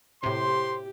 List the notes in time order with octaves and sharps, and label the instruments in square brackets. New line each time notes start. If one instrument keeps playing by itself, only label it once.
[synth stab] A2 C3 [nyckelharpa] G4 [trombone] C5 [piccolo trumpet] C6